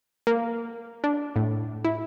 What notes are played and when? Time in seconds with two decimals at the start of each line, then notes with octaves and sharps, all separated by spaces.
0.27 A#3
1.04 D4
1.36 A2
1.85 E4